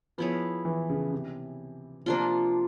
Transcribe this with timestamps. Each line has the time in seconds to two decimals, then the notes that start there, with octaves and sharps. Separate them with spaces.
0.18 F3 B3 E4 G#4 C#5
0.65 E3
0.90 C#3
1.13 C3
2.06 C3 F3 A#3 D4 F4